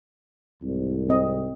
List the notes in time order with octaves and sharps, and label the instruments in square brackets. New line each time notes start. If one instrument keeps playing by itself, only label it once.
[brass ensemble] C2 G#2
[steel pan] C4 D#5